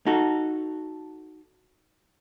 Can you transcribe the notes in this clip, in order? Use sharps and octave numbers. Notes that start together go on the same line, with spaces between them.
D#4 F#4 A4